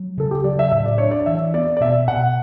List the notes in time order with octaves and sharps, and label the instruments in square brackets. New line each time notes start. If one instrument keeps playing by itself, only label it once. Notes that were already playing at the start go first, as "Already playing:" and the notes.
Already playing: [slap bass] F#3
[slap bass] C#3 [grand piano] A4
[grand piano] G4
[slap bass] F#3 [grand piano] D5
[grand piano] E5
[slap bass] A2 [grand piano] E5
[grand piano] D5
[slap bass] D4 [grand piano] C#5
[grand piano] D5
[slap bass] E3 [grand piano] E5
[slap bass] B3 [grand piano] D5
[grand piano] D5
[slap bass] B2 [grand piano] E5
[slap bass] B2 [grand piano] F#5